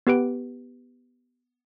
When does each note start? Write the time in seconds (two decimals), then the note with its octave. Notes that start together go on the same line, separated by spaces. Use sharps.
0.07 B3 G4 B4 D7